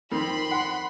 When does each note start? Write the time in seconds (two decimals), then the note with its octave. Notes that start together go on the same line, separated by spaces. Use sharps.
0.12 F2 D#3 B5 C6
0.51 F#5